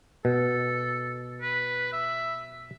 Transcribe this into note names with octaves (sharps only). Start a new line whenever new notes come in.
B2 A4
B4
E5